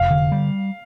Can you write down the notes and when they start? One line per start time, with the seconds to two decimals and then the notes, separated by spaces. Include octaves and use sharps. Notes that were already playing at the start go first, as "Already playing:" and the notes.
Already playing: F1 F5
0.11 D3
0.32 G3